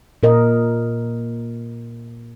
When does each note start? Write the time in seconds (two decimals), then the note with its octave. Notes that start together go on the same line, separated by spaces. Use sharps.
0.23 A#2 A#4 D#5